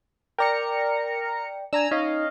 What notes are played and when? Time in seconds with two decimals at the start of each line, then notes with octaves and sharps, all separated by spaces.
0.38 A#4 D5 G5 A#5 C#7
1.73 D4 G#5 A#5 E6
1.91 C#4 D#4 D#5 F5